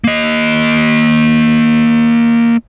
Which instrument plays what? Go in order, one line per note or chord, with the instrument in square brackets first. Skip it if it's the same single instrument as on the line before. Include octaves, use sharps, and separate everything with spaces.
[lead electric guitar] A#3 D#5